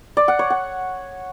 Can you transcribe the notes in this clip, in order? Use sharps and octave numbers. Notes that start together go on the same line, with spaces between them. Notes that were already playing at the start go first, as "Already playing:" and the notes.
D5
F#5
C#5
F#5